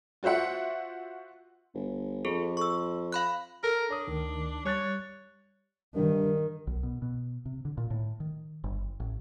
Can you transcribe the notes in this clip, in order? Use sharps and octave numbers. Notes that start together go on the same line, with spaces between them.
F4 F#4 C5 E5 F#5
G1
F2 G#4 A4
C#6 E6
F5 B5 F#6
A4 A#4
D4 C#5 D#6
D2 D#3
G3 C#5 F#6 A6
G2 D#3
B1
B2
B2
C3
D3
A#2
A2
D#3
G1
A1